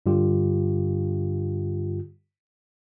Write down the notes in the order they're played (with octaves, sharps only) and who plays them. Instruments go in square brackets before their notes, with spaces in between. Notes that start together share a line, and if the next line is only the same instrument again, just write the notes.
[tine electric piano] G2 D3 G3 F4 G4